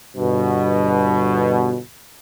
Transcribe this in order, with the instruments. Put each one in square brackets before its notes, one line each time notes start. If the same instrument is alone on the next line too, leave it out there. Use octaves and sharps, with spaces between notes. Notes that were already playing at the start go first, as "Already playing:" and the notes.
[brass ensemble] G1 G2 B2